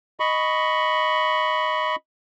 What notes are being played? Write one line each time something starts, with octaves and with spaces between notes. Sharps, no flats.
D#5 B5 C#6